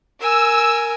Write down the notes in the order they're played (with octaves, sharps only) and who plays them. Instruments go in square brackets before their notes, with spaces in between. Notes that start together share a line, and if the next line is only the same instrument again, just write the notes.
[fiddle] A#4 G#5 [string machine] E6